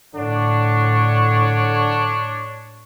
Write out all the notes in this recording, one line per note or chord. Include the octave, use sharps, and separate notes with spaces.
A2 D3 D4 C#5